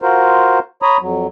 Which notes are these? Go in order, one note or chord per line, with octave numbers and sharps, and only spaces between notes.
F4 F#4 A#4 C5
C#5 A#5 B5 D#6
F2 F#3